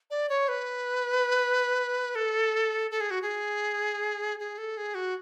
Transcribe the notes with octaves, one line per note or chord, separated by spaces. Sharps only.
D5
C#5
B4
A4
A4
G#4
F#4
G#4
G#4
A4
G#4
F#4